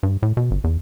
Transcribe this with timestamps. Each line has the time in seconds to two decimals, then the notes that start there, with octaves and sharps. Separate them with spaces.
0.03 G2
0.23 A2
0.37 B2
0.51 G1
0.64 E2